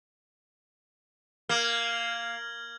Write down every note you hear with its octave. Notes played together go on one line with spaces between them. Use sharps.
A#3 F6 G#6 F#7